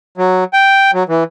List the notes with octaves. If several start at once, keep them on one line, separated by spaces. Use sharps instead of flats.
F#3
G5
F#3
E3